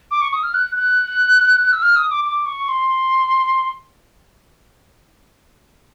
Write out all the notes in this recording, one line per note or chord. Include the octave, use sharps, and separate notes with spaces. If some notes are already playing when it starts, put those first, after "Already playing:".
D6
C#6
D#6
F6
F#6
F#6
E6
F6
D#6
D6
D6
C#6
C6